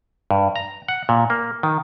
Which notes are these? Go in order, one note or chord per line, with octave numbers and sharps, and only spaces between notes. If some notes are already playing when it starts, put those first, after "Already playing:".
G2
A#5
F#5
A#2
A#3
D#3